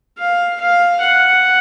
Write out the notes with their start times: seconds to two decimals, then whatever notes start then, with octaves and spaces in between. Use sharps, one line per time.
0.19 F5
0.61 F5
1.01 F#5